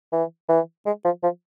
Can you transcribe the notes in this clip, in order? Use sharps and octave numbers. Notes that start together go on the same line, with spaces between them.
E3
E3
G#3
F3
F3